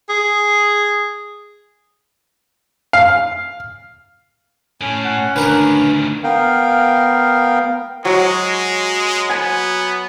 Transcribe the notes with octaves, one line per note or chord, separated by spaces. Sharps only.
G#4
F5
A2 C#4
F#5
D2 D#3 D4 A#4 B4
B3 A#4 F5 G5
F#3 G#3
B3 G#5